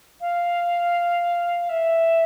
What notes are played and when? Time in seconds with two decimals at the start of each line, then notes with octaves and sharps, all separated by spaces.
0.21 F5
1.69 E5